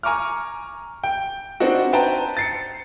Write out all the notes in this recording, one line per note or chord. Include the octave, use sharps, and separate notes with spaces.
G#5 A#5 C#6 D6 F6
G5
C4 D4 D#4 F#4
B4 C5 G5 A5 A#5
A6 C7 C#7